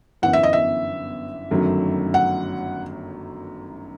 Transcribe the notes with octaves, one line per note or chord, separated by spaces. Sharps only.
G1 F#2 E3 B3 E4 F#5
E5
D#5
E5
G1 F#2 D#3 F#3 A3
F#5